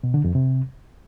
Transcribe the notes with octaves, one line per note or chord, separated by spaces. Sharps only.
B2
D3
F2
C3